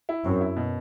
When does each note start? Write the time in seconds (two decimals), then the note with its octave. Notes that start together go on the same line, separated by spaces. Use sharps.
0.09 E4
0.24 F#2 C4
0.41 E4
0.56 B2